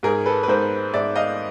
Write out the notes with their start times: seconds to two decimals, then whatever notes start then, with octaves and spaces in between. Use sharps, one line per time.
0.03 G#2 G#4 A#4
0.26 A4 B4
0.43 B4
0.48 G#2 A#4 C5
0.94 G#2 D5 E5
1.16 D#5 F5